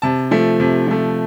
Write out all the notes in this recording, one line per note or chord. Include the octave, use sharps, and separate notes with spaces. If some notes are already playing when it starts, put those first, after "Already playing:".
C3 A5
F3 A3
C3
F3 A3